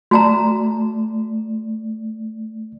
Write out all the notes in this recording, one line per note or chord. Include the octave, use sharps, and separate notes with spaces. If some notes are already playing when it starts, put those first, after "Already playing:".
A3 F#4 D5 A5 A#5